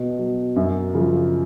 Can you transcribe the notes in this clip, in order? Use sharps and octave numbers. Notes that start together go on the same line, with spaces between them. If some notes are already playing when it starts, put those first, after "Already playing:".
Already playing: B2
F#3
F#2
C#3 F3